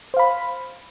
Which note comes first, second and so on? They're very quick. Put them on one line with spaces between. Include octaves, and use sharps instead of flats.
C5 F5 B5